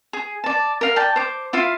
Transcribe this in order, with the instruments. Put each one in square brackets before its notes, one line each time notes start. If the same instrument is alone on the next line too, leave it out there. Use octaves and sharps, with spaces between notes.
[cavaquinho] G#4
D5 A5
A#4 F5
D5 G5 A5
C5 D6
E4 F4 F5